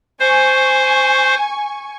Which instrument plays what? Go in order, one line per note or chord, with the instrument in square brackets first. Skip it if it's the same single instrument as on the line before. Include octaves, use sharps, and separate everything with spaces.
[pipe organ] C5 [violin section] G#5 C#6